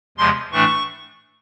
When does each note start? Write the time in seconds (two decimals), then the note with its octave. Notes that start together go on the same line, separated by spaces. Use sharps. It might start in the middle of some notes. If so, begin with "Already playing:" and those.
0.18 E2 C3 F3 G#3 C6
0.52 A2 E3 A3 D4 C#6